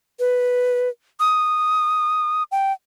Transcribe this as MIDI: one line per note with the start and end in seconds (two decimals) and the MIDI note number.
0.20 0.89 71
1.20 2.43 87
2.52 2.73 79